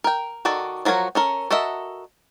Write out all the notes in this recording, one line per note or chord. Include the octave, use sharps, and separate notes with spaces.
A#4 G5
D#3 F#4 A4 D5
F3 F#3 F#4 A#4 C#5
C#4 A4 A#4
F#4 A4 A#4 D#5 E5